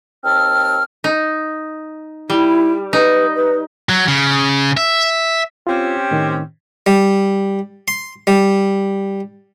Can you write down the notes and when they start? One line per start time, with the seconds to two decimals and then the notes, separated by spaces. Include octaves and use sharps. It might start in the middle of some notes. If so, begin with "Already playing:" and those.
0.24 D#2 C4 A5 E6 F6
1.04 D#4
2.30 G3 E4
2.93 D#4 B4
3.36 B4
3.89 F#3
4.08 C#3
4.77 E5
5.67 C4 C#4 F4 G4
6.11 A2 D#3
6.86 G3
7.88 C6
8.27 G3